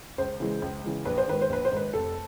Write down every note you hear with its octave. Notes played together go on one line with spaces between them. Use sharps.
C#2 C5
C#3 E3 G#3
C#2
C#3 E3 G#3
A#1 B4
C5
G#2 D#3 B4
C5
A#1 B4
C5
G#2 D#3 B4
F1 A4